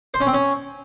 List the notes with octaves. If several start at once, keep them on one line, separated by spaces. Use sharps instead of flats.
C5
C#4
C4
C#4